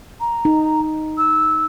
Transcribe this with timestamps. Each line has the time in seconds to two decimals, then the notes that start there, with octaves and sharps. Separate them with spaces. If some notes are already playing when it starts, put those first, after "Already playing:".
0.20 A#5
0.45 D#4
1.18 E6